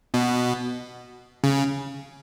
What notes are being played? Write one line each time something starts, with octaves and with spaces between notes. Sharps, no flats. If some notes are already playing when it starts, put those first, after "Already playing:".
B2
C#3